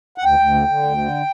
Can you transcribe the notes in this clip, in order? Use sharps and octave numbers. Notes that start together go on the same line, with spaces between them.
F#5
D2 G5
D2
D3
D3
D2
D3